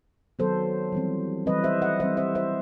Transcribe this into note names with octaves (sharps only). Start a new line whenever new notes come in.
D#3 F#3 B3 A4 C5
E3 G3 C4
E3 G3 C4 B4 D#5
C5 E5
D#5 F#5
E3 G3 C4 C5 E5
C5 E5
C5 E5